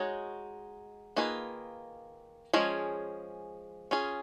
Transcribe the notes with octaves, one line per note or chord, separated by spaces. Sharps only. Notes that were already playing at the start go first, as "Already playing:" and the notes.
Already playing: G#3 D#4 F#4 C#5
D#3 A#3 F4 G#4 B4
F3 G#3 C#4 G#4
C#4 F4 G#4